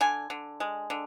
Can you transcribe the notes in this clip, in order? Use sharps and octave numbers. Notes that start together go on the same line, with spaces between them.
D3 G#5
D3
G#3
D3